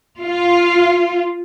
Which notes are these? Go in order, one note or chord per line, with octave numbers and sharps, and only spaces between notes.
F4